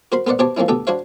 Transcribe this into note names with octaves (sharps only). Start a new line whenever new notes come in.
F#4 A#4 C5 B5 C6
B3 A#4 C5 D5 F#5
B2 G4 C5 C#5 A5 D6
F3 A#3 C4 C#4 E4
D2 B2 G4 A4 G5
D4 F#4 C5 C#5 F5